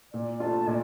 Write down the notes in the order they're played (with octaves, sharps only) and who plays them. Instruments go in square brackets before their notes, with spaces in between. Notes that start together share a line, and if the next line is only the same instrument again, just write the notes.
[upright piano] A#2 [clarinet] D5
[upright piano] A3 D4 F4 [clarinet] A5
[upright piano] A#2 [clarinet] D5